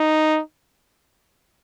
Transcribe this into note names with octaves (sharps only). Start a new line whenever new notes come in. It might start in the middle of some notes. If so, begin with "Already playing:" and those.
Already playing: D#4